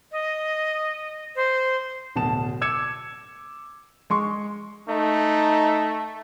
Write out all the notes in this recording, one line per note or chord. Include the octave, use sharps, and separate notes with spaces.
D#5
C5
D1 B2 A5 E7
D6 E6 G#6 C#7 E7
G#3 C6 C#6
A3 D#4